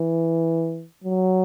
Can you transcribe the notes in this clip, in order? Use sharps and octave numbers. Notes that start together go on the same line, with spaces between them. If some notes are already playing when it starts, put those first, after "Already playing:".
Already playing: E3
F#3